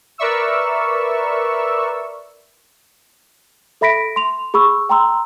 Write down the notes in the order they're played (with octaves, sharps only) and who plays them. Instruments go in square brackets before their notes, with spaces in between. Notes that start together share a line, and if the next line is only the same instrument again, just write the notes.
[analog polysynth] A#4 B4 D5 E5 C#6 E6
[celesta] A4 E5 B5 A#6 B6 D7
C6 F7
G#4 B5 C#6 E6
G5 A#5 C6 E6